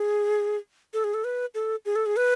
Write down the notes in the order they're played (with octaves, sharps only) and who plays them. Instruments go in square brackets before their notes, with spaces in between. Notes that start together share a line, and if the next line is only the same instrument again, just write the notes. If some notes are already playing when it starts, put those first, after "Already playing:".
Already playing: [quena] G#4
A4
G#4
A4
B4
A4
G#4
A4
G#4
B4